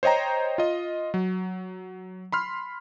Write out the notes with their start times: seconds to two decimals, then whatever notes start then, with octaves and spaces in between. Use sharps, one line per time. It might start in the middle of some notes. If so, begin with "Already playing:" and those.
0.03 C5 C#5 D#5 G5 A#5
0.58 F4 D#5
1.14 F#3
2.32 B5 C6 F6